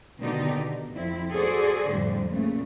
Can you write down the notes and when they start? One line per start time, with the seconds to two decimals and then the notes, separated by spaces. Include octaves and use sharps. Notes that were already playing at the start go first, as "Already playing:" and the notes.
0.21 B2 D3 D#3 D#4 G4 D5
0.54 B2
0.94 F2 C4 E4
1.31 F#4 G#4 A4 C5 D5
1.91 F2 A2 D3 G3
2.30 A#2 C#3 A3